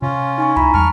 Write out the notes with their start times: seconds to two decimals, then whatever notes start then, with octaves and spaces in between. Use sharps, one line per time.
0.02 C3 C#4 F4
0.38 D#4 G#5 C#6
0.56 C#2 E4 A#5 B5
0.74 E2 G3 A5 C#6 F6